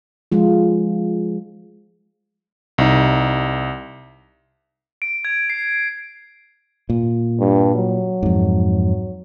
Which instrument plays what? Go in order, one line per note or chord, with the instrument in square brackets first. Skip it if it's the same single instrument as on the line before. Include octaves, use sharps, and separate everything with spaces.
[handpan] F3 G#3 F4
[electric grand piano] C2 D#4
[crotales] D7
G#6
C7
[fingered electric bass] A#2
[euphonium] G2
F#3
[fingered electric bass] F2 G#2